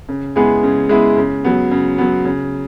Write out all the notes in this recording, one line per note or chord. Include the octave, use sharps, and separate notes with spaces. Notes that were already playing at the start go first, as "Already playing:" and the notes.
C#3
G#3 B3 E4 G#4
C#3
G#3 B3 E4 G#4
C#3
F#3 B3
C#3
F#3 B3
C#3